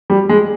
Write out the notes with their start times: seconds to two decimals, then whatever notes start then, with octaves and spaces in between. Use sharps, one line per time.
0.10 G3
0.29 G#3